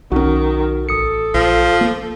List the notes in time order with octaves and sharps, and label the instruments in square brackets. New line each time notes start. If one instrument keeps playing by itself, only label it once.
[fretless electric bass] B1 C#4 [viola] D#3 [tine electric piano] F#4
[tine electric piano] A1 D#6 C#7 [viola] A4
[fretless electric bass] A#1 [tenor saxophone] F3
[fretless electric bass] A#3